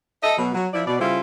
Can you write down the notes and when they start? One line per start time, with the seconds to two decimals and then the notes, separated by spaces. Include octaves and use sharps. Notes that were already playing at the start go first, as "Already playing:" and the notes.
0.23 A4 D#5 E5
0.37 B2 F#3
0.54 F#3
0.73 F3 E4 D5
0.86 B2 D5
0.99 C#3 G3 E4 F4 A4 C5